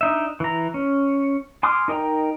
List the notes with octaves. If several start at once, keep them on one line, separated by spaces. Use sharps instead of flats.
D4 D#4 E5
E3 A#5
C#4
G#5 C6 D6 D#6 F6
D#4 A#4 D#5 G5 A#5